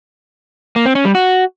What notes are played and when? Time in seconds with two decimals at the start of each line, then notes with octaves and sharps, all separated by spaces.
0.76 A#3
0.86 C4
0.95 C#4
1.05 G3
1.15 F#4